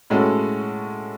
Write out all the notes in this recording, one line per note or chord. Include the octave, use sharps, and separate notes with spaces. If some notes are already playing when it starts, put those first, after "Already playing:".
A2 G#3 C#4 F#4 A4